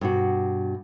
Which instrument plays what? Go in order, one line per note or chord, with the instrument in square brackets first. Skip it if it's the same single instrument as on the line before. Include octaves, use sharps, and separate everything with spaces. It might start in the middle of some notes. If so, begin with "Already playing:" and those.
[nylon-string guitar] G2 B2 F#4